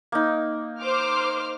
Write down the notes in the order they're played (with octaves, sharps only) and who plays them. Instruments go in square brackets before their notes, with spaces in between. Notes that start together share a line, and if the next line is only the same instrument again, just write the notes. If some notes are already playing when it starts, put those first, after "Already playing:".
[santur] A#3 D#4
[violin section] C5 D6 F6